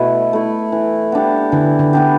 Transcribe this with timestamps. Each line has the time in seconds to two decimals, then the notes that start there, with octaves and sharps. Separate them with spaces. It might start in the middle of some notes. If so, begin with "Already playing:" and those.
Already playing: B2 A3 E4
0.33 A3 E4
0.72 E3
1.12 B3 D4 G4
1.52 D3 E3
1.79 D3
1.93 B3 D4 G4